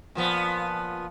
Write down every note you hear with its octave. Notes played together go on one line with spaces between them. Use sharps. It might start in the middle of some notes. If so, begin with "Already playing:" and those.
A#2 F3 B3